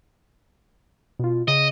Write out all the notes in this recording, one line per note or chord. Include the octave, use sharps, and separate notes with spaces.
B2 F4
C#3 D#5